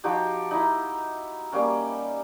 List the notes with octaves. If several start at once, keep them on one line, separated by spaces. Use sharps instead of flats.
F3 D#4 F#4 G4
D#4 E4
G3 A#3 C#4